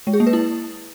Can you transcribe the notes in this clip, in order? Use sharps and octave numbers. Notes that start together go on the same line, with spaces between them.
G#3
G#4
A#3
B4
E4